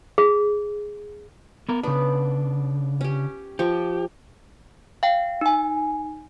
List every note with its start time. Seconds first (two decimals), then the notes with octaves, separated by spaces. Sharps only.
0.18 G#4
1.69 B3 A#4
1.83 C#3 B3 D4
3.01 C#4 G4
3.59 F3 G4 C#6
5.03 F5 G5
5.41 D#4 G#5